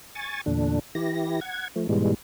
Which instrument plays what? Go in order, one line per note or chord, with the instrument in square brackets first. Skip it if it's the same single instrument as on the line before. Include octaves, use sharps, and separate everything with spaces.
[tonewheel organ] G#5 C#6 A6
E2 A#2 D3 D4
E3 E4 G4 A#6
F#5 G#6
F3 A3
G#2 B2 E3 G3 G#3